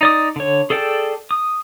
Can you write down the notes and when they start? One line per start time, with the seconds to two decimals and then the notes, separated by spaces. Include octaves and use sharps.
0.01 D#4 D5 D#6
0.36 D3 C#5
0.70 G#4 A4 D5 G5 A5
1.31 D#6